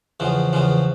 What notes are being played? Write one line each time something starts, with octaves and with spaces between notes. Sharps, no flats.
E2 C#3 F3
E2 C#3 F3